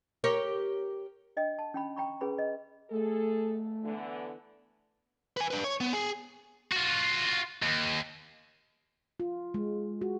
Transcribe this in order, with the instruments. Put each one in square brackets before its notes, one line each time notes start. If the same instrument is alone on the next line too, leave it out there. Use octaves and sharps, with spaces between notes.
[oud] G4 A#4 C#5
[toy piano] D4 D#5 G5
A5
C#4 G5 B5
G5 A#5 B5 C#6
C#4 G#4 B4 B5
D#5
[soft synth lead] A3 [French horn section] G#4 A4
[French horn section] D3 E3 B3
[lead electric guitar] B4 G#5
D4 B4
C#5
B3
G#4
[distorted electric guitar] F4 F#4
D#2
[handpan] F4
G#3
F#4